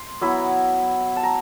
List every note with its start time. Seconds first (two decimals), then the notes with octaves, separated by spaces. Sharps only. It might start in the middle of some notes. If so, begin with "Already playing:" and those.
Already playing: C6
0.21 F#3 B3 E4 B5
1.16 A5
1.23 A#5